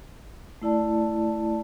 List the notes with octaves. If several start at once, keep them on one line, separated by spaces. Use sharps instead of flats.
A3 E4 D5 A5